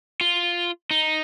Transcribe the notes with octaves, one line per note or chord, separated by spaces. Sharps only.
F4
D#4